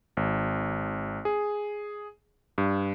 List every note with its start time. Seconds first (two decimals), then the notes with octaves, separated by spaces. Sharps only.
0.17 G#1
1.25 G#4
2.58 G2